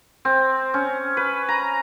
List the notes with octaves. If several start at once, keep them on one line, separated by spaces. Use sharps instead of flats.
C4
C#4
B4
A#5